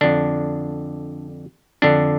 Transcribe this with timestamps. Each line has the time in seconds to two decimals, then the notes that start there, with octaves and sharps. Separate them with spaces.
0.01 F2 D3 D4
1.82 F2 D3 D4